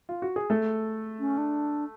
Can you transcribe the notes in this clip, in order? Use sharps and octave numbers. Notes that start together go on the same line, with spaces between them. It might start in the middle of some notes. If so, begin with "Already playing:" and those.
F4
F#4
G#4
A3 A4
C#4
D4